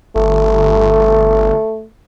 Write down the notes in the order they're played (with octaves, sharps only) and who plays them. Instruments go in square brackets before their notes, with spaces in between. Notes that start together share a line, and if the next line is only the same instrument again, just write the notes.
[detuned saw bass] G1 [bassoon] A3